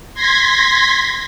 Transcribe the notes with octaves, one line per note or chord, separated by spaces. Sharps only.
C6 G#6 A#6 B6